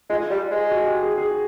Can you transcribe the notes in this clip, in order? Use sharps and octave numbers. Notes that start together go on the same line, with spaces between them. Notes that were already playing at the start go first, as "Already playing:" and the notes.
G#3 F4
G3
G#3
F#4
G4
G#4
G#4